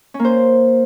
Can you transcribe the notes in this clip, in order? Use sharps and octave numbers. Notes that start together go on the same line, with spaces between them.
C#4
A#3
C5